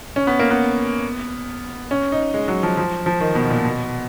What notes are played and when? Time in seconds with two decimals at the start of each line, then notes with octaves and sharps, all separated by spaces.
0.16 C#4
0.27 B3
0.39 A#3
0.51 B3
1.91 C#4
2.12 D#4
2.34 G#3
2.48 F#3
2.63 F3
2.77 F3
3.06 F3
3.20 D#3
3.35 B2
3.50 A#2
3.65 B2